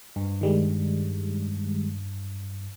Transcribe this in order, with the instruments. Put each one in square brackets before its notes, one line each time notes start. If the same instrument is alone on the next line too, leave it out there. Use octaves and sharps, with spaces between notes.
[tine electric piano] G2
[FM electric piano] D#3 G3 G#3